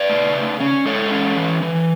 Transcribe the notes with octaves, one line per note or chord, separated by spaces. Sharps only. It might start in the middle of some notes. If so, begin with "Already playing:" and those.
Already playing: B4 D5
A3
C#3
C#4
G#3 A4 C#5
C#4
E3
E3